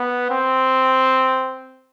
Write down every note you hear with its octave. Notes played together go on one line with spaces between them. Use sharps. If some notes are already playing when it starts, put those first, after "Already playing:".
Already playing: B3
C4